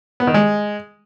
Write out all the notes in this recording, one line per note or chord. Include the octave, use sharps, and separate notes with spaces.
B3
D#3
G#3